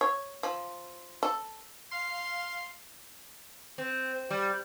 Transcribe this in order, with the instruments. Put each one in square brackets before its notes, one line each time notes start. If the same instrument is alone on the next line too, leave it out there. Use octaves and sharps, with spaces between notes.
[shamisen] C#5
F3
A4
[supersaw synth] F5 C7 [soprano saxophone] C6
[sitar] C4
G3